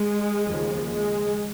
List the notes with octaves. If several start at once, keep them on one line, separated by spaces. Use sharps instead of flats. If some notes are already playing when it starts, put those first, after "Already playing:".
Already playing: G#3
D#2 C#3 F3
G#3